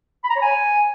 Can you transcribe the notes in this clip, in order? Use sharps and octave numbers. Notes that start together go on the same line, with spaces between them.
B5
A#5
C#5
G#5